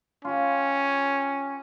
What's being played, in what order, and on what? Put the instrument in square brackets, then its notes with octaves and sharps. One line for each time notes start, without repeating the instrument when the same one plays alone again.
[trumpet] C#4 [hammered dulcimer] F4 G4